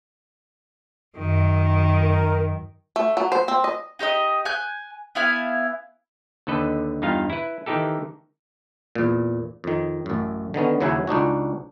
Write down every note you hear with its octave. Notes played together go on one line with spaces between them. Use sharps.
F#2 D#3
A#4
A3
F#3
C5
C4
D#5
D#4 G4 C5 D#5
G#5 F#6 G6
B3 E4 F5 G#5
D#2 D3 A4 B4 D#5
E2 G2 D#4 F4 F5
E4 B4
D#3 E3 D#4 G4 A4
E2 A#2
F2 D#3
A1 F#2
D3 D#3 B3 C#4
D#2 C#3 F#3 E4 F#5 G#5
C#2 D4 D#4 F#4